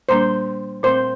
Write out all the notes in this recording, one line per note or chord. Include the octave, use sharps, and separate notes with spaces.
A#2 G3 A#3 D4 C5
A#2 A3 C4 C5